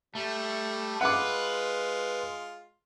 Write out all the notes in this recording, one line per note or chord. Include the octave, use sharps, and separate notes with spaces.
G3 A3
G#3 F4 B4 F#5 D6